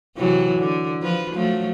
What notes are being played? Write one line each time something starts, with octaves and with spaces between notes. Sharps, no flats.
C3 E3 F#3
D3
F3 F4 B4
F3 F#3 A3